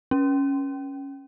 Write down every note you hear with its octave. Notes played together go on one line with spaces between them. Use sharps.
C#4